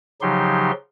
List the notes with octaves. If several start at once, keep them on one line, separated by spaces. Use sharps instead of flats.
C#3 F3 F#3 D#4 G4 C6